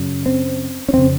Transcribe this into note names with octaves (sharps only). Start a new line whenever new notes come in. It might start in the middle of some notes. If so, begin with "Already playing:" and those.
Already playing: F#2 C#3
C4
C#4
F2 C#3 C4